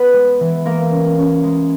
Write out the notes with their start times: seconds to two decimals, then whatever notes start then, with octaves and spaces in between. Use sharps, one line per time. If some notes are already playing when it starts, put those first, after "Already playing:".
Already playing: B3 B4
0.13 G#3
0.40 E3
0.65 G#3 A#3 A#4
0.91 C#4
1.18 C#4
1.44 G#3